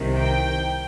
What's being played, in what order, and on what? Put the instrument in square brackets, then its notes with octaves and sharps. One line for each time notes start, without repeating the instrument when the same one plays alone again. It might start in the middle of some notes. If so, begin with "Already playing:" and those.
Already playing: [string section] C2 C3 D#3
G5